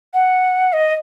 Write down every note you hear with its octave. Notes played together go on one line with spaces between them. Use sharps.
F#5
D#5